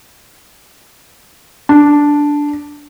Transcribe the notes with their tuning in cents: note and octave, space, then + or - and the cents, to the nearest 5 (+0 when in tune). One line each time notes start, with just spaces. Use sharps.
D4 -5